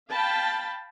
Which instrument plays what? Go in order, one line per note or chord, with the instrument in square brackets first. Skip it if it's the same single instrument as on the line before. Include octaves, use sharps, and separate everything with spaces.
[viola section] F5 G5 A5 B5